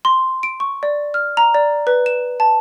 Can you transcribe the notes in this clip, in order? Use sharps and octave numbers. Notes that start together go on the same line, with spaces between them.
C6
D7
C#6
D5
F6
A#5
D5
B4
E7
A5